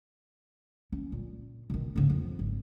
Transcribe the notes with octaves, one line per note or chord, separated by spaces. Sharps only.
C#4
A#2
B2 D#3
G#2 C#3
F2 F3
G#1